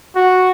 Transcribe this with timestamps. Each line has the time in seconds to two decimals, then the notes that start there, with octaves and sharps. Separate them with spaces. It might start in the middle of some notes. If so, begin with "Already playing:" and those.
0.16 F#4